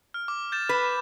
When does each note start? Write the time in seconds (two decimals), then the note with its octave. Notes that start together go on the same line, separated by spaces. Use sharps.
0.14 F6
0.28 D6
0.52 G6 A6 E7
0.69 B4 F#6
0.85 E7